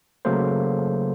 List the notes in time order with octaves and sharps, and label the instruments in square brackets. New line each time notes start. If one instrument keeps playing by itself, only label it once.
[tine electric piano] C#3 F#3 A3 A#3 A4 C5